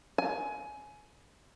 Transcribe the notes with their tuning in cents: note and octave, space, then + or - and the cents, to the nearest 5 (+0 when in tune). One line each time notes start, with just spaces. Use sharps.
G#5 +20